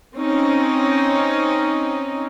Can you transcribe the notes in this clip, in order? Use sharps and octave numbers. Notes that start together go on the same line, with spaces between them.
C4 C#4 D#4